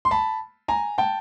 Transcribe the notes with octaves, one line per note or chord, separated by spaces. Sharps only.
C6
A5 B5
G#5 A#5
G5 A5